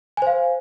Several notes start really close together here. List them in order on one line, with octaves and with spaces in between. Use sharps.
G#5 C5 F5